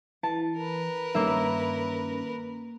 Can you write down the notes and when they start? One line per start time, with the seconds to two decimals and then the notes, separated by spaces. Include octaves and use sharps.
0.23 E3 A5
0.57 A#4 B4
1.15 G2 D#3 A#3 C#4 E5